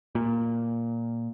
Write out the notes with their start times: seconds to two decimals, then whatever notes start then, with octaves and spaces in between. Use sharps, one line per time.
0.15 A#2